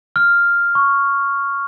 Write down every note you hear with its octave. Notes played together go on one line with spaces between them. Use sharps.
F6
C#6